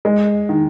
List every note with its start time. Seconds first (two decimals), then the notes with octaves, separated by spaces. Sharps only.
0.05 G#3
0.49 D#3